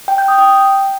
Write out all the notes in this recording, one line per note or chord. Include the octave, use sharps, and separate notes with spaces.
G5
G6
D#6
G5